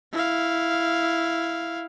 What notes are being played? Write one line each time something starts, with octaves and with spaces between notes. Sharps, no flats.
E4 F5